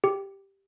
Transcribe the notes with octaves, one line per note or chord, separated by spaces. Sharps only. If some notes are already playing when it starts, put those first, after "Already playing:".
G4